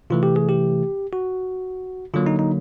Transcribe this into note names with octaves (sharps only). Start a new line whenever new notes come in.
C3 E3 A3 F4
G4
G#4
G4
F#4
D3 F#3 A#3 F4
D#4
D#4